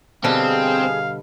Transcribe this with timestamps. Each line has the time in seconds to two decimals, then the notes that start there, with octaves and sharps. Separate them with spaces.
0.24 B2 D3 G3 C4 G#4 F5